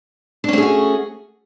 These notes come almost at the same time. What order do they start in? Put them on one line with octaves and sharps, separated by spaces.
D4 C#4 A3 G#4 F#4